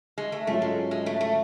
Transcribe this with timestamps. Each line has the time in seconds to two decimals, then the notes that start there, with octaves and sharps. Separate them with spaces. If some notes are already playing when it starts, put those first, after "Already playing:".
0.18 G#3
0.32 A3
0.47 G#2 F#3 A3 C#4 F4
0.62 G#3
0.91 G#3
1.06 A3
1.21 A3